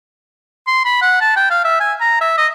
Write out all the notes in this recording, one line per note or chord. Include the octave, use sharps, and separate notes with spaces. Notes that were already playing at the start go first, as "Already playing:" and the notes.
C6
B5
F#5
A5
G5
F5
E5
G#5
A#5
E5
D#5